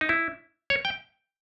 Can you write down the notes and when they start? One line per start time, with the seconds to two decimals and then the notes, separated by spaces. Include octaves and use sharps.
0.01 D#4
0.09 E4
0.70 C#5
0.85 G5